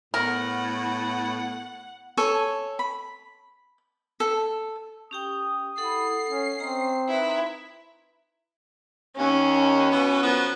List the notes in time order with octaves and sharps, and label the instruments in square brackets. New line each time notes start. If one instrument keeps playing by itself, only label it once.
[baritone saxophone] A2 [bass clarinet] B3 [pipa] A#4 [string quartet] F#5
[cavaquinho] A4 C#5 G#5
B5
A4
[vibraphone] C#4 G4 G5 [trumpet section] D#6
[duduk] E4 [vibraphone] A4 F#5 [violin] C7
[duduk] C#4
[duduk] C4 [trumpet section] C#4 D#5 [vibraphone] A#5 C6
[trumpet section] D#4 B4 [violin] E4
[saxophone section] D#2 [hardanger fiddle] C#4
[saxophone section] B2 E3 B3
F#2 F3 B3